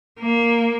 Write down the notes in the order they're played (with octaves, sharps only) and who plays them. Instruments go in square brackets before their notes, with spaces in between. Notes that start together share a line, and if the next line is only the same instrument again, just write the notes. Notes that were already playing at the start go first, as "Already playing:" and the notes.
[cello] A#3